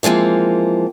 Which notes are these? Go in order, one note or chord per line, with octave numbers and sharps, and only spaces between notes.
E3 F3 G#3 A#3 C4